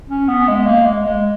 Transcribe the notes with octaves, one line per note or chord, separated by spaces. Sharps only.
C#4
B3
G#3
A#3
G#3
G#3